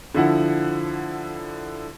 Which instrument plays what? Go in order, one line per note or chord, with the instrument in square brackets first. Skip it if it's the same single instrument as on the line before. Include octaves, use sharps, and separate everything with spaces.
[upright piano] D3 F3 E4 F#5